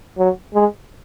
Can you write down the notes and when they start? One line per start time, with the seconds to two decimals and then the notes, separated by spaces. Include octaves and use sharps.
0.18 F#3
0.54 G#3